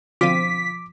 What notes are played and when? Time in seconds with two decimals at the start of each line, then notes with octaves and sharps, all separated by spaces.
0.21 B2 D3 F3 C4 F4 D6 B6 D#7